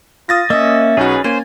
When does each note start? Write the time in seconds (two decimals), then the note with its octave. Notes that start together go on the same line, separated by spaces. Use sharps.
0.29 F4 D#6 A6 A#6
0.50 A#3 C#4 D#5 E5
0.97 B1 C#4 D#4 F#4 G#4 B4
1.24 A#3 C#4 C5 G#5